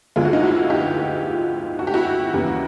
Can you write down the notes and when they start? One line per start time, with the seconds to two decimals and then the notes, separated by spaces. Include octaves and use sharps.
0.16 D2 D3 F3 G#3 F4
0.25 F#4
0.33 D#4 F4
0.43 E4 F#4
0.70 F4 G4
1.79 F#4
1.87 G4
1.94 E4 F#4
2.33 D#2 C#3 E3 G3